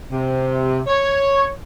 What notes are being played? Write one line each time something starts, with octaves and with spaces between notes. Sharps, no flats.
C3
C#5